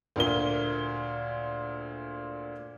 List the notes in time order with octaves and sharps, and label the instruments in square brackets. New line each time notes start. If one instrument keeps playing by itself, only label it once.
[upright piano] D2 A#2 A#4 G7